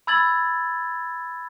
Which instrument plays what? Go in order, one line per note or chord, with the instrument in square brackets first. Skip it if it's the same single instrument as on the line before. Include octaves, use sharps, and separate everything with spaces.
[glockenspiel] B5 E6 G#6 A6 F#7